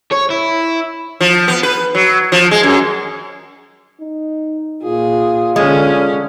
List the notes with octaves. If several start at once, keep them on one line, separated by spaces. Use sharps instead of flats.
C#5
E4
F3
B3
B4
F#3
F3
G#3
F#2
D#4
A#2 F4 G#4
D3 G#3 C#4